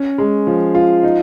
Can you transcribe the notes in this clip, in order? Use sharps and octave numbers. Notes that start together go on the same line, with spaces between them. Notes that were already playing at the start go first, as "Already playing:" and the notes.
Already playing: C#4
G#3
F3
F4
D#4